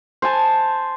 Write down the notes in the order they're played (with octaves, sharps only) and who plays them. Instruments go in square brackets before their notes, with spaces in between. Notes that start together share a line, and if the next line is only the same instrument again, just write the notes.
[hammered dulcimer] C5 G#5 A5